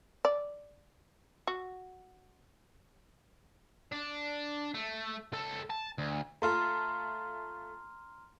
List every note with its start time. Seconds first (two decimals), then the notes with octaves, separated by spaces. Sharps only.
0.25 D5
1.47 F#4
3.92 D4
4.74 A3
5.33 C#2 A4
5.70 A5
5.98 D2
6.42 A3 F4 A4 A#5 C6 F6